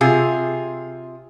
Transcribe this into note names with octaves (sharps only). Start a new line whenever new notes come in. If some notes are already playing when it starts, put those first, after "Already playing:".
C3 F4 G#4